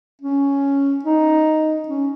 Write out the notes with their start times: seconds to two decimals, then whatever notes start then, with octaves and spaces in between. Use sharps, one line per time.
0.22 C#4
1.04 D#4
1.88 C#4